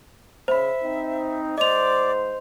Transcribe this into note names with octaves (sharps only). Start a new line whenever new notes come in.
C#3 C5 E5 B5
C4 D#4
G#2 C5 D5 D#5 D6 F7